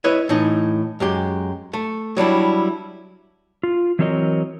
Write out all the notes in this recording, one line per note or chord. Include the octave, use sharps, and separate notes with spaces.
E4 B4 C#5 D#5
A2 E3 D#4
F#2 G#3 G4
A3
F#3 G3 D4 E4
F4
E3 F#3 C4 A#4 C#5 D#5